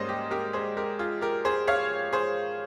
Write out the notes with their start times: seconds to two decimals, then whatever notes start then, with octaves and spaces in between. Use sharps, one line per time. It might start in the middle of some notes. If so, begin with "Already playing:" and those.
Already playing: G#2 G3 A#3 C#4 C5 D#5
0.09 G4
0.31 G4 A#4
0.53 G#4 C5
0.77 G4 A#4
0.99 F4 G#4
1.21 G4 A#4
1.45 G#4 C5
1.68 C#5 F5
2.13 G#4 C5